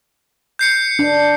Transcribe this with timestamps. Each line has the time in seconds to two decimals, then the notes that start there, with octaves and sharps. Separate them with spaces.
0.59 G6 C7 C#7
0.99 D4